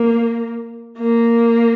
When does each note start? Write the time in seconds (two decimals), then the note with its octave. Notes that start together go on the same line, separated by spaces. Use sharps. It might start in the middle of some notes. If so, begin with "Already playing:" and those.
Already playing: A#3
0.98 A#3